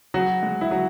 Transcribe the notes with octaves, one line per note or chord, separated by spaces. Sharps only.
C#3 F#3 F#4
G#3
E4
C#3 F#3 F#4